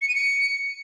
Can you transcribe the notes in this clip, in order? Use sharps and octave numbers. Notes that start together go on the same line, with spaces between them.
C#7
D#7
C#7